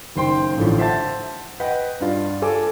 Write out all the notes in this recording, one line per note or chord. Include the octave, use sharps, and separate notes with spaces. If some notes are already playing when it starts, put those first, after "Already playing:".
F#1 D#3 C5 G5 C6
A1 A2 D3 F3
C5 E5 F#5 A5 A6
B4 D#5 F#5 G5
G2 D4 F4
A4 G#5 D6